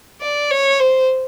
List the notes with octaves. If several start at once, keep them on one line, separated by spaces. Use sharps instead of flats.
D5
C#5
C5